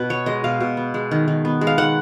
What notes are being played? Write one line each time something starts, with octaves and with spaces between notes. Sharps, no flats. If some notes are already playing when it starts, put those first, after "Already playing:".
Already playing: B2 B4
B3 C#5
G#3 D#5
B2 F5
B2
B3
G#3
D#3
D#3
B3
G#3
F5
D#3 F#5